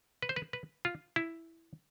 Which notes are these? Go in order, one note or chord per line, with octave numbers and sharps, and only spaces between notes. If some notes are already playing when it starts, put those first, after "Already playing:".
B4
C5
B4
B4
F4
E4